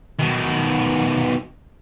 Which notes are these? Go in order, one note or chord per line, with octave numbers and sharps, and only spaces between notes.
B2 D#3